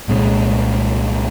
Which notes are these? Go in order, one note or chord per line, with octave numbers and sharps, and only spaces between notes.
C2 A#2 G#3 C#4